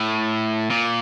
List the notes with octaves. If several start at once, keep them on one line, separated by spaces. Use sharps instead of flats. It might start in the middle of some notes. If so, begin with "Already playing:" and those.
Already playing: A2
A#2